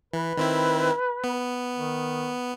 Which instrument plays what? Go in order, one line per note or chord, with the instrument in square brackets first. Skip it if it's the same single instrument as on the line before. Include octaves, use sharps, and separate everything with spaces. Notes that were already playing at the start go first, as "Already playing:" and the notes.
[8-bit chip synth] E3 [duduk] B4
[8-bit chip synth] D#3 C4 E4
B3
[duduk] D#3